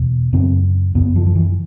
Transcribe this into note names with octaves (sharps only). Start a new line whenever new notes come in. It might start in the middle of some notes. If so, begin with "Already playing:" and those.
Already playing: E2 B2
F#2 C#3 C4
F#2 C#3 B3
F3
F3
E3